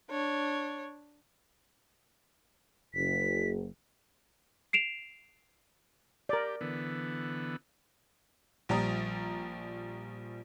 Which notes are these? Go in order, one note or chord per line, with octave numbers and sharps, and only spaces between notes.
D4 C#5
F#1 B6
C7 D7 E7 F7
G4 A#4 D5
D3 E3 B3
A#1 F3 G3 A#5 D#6